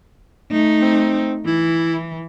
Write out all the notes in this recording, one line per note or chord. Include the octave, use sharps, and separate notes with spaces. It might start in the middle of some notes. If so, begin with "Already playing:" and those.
A3 D#4
C4
E3 E4